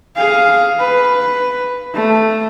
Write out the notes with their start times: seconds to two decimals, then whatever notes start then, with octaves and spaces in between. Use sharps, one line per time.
0.16 G#4 F5
0.79 B4
1.94 A3